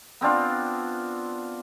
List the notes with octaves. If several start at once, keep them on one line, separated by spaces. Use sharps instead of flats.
B3 C4 D4 F4